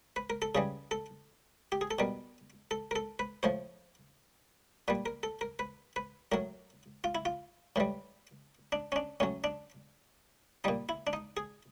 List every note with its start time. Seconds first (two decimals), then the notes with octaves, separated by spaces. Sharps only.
0.16 B4
0.30 A#4
0.42 A4
0.55 C#3 E3 G3 G#4
0.91 A4
1.72 G4
1.81 G#4
1.91 A4
1.99 B2 G3 A#4
2.71 A4
2.91 A#4
2.96 A4
3.19 B4
3.43 A2 F3 C5
4.88 A#2 G3 B4
5.06 A#4
5.23 A4
5.41 A#4
5.59 B4
5.96 B4
6.32 A2 F#3 A#4
7.04 F4
7.15 E4
7.25 F4
7.76 A2 E3 G3
8.72 D4
8.92 C#4
8.96 D4
9.20 A2 F#3 C#4
9.44 D4
10.64 A#2 G3 D#4
10.89 E4
11.07 D4
11.13 D#4
11.37 G#4